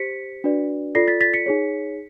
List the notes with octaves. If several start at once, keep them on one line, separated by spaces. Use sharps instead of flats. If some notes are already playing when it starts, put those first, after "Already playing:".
Already playing: G4 C5 B6 C#7
D4 F#4 B4 D5
F4 A4 D5 A#6 C7
A6 B6
A6 B6
B6 C#7
D#4 G#4 C#5